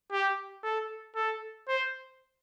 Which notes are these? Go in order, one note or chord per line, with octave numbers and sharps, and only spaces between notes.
G4
A4
A4
C5